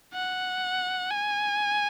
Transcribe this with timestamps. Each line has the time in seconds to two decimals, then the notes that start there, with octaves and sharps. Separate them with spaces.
0.13 F#5
1.11 G#5